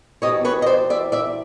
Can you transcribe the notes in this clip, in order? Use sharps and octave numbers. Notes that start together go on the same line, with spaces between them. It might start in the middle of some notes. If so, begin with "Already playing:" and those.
E2 B2 G3 C4 C#5 D#5
B4 C#5
D#5
C5 D5
D5 E5
D5 E5